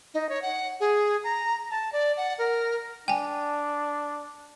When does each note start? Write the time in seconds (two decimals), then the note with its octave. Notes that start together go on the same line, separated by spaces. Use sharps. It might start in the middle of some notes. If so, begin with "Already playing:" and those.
0.14 D#4
0.29 C#5
0.42 F#5
0.80 G#4
1.24 A#5
1.70 A5
1.93 D5
2.17 F#5
2.38 A#4
3.08 D4 G5 G#5